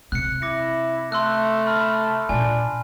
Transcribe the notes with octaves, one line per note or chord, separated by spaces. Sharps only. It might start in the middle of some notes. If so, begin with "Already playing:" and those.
C3 F#6 C#7
E4 D6 A#6 C#7
A3 C6 E6 F#6
B5 F6
A#2 D4 F4 G#5